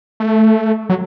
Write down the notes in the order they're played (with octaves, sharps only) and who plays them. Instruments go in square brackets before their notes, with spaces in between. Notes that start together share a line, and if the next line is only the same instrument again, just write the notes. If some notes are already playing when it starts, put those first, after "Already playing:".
[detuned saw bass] A3
F#3